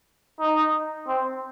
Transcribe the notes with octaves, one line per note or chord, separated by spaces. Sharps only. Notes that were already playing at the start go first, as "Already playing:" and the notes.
D#4
C4